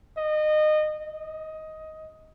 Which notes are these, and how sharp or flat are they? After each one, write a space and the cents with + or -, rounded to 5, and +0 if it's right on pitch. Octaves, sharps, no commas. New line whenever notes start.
D#5 -25
D#5 +15